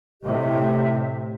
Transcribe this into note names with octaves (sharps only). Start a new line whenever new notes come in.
A2 C3 G4 D#5 E5